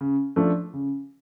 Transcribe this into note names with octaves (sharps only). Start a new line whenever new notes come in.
C#3
F3 A3 D4
C#3